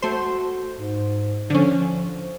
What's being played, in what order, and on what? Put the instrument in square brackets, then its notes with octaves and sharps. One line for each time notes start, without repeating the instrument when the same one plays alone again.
[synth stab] A3 C5 [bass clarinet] F#4
[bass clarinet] G#2
[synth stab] D3 C#4 [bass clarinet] F3